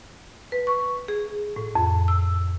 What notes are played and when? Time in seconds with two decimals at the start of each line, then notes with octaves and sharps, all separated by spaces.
0.52 B4
0.67 C#6
1.08 G#4
1.56 A2
1.75 F2
2.08 E6